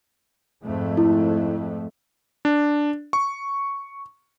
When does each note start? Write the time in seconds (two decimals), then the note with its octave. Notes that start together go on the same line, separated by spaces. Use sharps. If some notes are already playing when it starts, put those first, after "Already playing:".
0.62 F2 G#2 A3
0.97 E4
2.45 D4
3.13 C#6